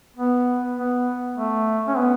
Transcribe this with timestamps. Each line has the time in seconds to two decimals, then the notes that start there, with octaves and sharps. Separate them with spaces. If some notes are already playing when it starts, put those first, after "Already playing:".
0.16 B3
0.77 B3
1.37 A3
1.88 C#4
1.97 B3